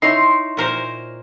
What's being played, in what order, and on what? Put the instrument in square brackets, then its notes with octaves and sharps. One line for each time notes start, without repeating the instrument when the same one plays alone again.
[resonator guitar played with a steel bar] D#4 E4 C#5 [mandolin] C6
[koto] A#2 A#4 C5